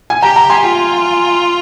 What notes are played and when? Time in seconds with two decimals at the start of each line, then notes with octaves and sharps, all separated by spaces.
0.10 G#5
0.22 G4 G5 A#5
0.36 G5 A#5
0.50 G#5 C6
0.64 F4